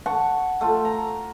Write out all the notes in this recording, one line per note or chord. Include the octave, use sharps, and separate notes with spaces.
F#5 A5 C#6
A3 F4
A#5